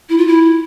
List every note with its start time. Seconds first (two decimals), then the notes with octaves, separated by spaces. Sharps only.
0.09 E4
0.18 F4
0.27 E4